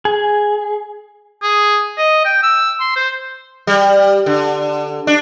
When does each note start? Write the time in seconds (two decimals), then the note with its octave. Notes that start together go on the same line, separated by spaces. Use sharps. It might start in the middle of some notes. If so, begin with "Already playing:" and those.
0.05 G#4
1.43 G#4
1.98 D#5
2.25 G5
2.43 E6
2.81 C6
2.96 C5
3.67 G3
4.26 D3
5.07 D4